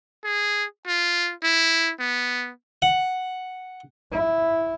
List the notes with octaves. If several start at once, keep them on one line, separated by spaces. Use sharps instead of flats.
G#4
F4
E4
B3
F#5
E4